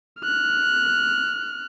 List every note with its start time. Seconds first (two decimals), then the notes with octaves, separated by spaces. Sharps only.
0.21 F6 F#6